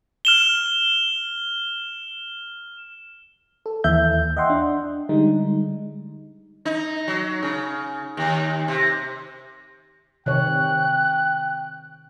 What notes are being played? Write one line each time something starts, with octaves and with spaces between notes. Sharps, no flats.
F6 E7 G7
A4
D#2 E3 E5 G6
D#5 E5 F#5 G5 C6
D4
D3 G3 G#3 D#4
D#4
F#3
C#3
D#2
C3
C3 D#3 C#5 G5 F#6